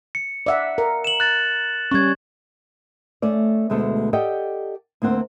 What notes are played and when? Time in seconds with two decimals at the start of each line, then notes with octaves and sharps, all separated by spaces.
0.15 C#7
0.46 D5 E5 F#5
0.78 A#4
1.04 E7 F#7
1.20 F#6 A6
1.91 G3 C#4 C#6 G#6
3.22 A3 C#4 D5
3.70 D2 B2 G#3 A3 A4
4.13 G4 A4 D5 D#5 F#5 G5
5.02 D2 A#3 C4 F#5